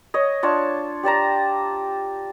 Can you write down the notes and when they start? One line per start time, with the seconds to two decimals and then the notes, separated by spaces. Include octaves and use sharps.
0.14 C#5 D#5
0.43 D4 F4 C#5 A5
1.03 G4 D5 A5 A#5